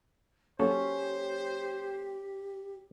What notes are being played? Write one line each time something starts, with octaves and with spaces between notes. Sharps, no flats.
F#3 A#3 C#4 G4 A4 C5